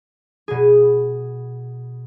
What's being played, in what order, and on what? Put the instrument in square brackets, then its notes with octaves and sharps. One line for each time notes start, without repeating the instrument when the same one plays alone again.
[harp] B2 G#4